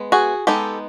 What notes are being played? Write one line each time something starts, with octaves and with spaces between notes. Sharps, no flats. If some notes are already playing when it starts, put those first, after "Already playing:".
Already playing: G#3 B3
F#4 G#4
G#3 B3 D#4 G4 A4